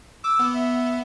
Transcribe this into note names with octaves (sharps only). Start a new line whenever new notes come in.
D6 E6
B3
E5